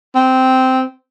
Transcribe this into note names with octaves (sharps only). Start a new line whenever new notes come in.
C4